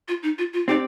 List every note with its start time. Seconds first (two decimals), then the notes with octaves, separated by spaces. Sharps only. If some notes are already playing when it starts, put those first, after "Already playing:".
0.08 F4
0.23 D#4
0.38 F4
0.53 F4
0.68 C4 D#4 G4 D5